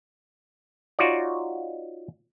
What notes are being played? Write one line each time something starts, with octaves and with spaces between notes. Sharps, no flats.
D#4 F4 F#4 C#5 D5